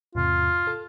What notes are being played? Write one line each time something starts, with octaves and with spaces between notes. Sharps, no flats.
E2 G#2 C3 F4
A4